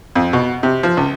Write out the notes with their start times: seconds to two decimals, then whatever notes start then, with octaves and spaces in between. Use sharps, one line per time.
0.15 F2
0.33 B2
0.63 C3
0.83 F3
0.97 C#2